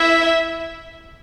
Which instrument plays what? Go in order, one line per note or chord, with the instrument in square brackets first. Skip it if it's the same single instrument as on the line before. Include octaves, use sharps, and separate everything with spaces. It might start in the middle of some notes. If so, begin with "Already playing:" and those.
Already playing: [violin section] E4 E5